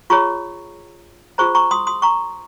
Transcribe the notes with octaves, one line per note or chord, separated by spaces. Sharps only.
F4 G#4 C#5 A#5 C#6
F4 G#4 C5 A#5 C#6
A#5 C#6
C6 D#6
C6 D#6
A#5 C#6